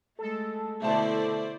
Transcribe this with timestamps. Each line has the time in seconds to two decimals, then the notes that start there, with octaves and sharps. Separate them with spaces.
0.19 G#3 A3 A4
0.82 B2 D3 A3 E4 C5 D5 A5